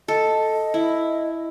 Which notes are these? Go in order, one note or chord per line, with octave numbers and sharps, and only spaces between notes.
A4 D#5
E4